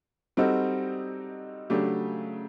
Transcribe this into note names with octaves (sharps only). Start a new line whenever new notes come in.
G3 C4 D#4 F#4 A4
C#3 F#3 A3 D4 G4